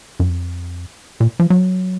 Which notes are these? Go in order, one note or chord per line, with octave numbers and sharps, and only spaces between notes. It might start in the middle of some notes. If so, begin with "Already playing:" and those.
F#2
F2
A#2
F3
F#3